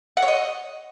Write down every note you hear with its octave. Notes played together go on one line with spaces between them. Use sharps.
F#5
C#5
D#5